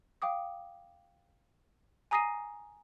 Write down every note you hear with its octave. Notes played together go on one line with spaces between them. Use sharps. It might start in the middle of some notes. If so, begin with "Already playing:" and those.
F5 G5 D6 D#6
G#5 A#5 D#6 A#6 C7 D#7